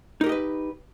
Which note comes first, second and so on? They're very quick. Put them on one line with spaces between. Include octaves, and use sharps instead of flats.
D#4 A#4 G4 D#5 B4